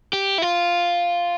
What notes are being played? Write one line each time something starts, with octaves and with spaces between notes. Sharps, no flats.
G4
E4
F4